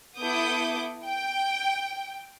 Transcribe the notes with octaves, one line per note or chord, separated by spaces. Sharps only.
B3 E4 A4 D6 D#6 G6
G5